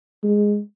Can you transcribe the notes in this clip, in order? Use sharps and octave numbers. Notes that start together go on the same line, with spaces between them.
G#3